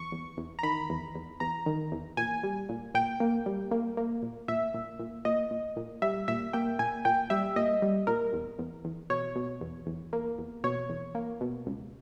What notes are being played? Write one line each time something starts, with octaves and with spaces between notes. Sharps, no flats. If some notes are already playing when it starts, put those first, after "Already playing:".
Already playing: E2 C#6
E2
E2
A#5
D#3 B5
E2
E2
E2 A#5
D#3
E2
A#2 G#5
G3
A#2
A#2 G5
A#3
G3
A#3
A#3
A#2
A#2 E5
A#2
A#2
A#2 D#5
A#2
A#2
G3 E5
A#2 E5
A#3 G5
A#2 G#5
A#2 G5
G3 E5
A#2 D#5
G3
A#2 A#4
E2
E2
E2
B2 C#5
B2
E2
E2
A#3
E2
B2 C#5
E2
A#3
B2
C#2